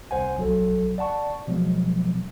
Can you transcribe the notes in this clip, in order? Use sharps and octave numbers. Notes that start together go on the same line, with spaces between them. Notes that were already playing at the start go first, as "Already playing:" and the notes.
C2 C5 F#5 G#5
B1 F#3 A4
D5 F#5 A5 C#6
B2 F3 F#3 G#3 B3